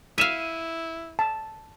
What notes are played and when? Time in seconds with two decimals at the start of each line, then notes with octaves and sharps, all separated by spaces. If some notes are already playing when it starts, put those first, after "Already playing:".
0.18 E4 E5 F5 D#7 E7
1.19 A5